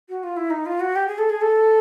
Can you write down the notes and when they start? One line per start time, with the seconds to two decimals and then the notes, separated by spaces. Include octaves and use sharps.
0.09 F#4
0.23 F4
0.37 E4
0.50 D#4
0.66 F4
0.80 F#4
0.96 G4
1.07 G#4
1.18 A4
1.30 G#4
1.41 A4